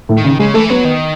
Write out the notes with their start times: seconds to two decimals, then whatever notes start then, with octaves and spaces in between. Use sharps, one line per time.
0.09 A2
0.17 D#3
0.24 C#3
0.39 C#3 G#3
0.54 E3 A3
0.69 F#3 B3
0.85 D#3